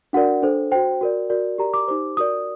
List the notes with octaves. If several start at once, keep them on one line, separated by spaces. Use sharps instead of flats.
D4 F#4 A#4 D5 F#5
D4 A4 C5
F#4 C5 G5
F#4 A#4 D5
F#4 A#4 D5
G4 A#4 D5 A#5
D6
D#4 G4 C5 D6
F#4 A#4 D5 D#6